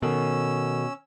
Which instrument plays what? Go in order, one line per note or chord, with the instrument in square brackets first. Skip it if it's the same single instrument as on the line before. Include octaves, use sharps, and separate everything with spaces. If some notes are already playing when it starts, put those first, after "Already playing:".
[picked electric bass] B2 [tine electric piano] D#3 A4 A#4 [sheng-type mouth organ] C#4 E6